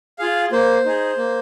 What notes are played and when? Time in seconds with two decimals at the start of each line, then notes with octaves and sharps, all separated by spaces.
0.19 F4 G#4 F5
0.52 A#3 C5
0.86 D#4 G#4
1.17 A#3